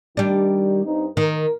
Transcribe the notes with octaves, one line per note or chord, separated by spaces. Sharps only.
D#3 G3 D4 D#4 G4
G2 C4 D#4
D#3 A#4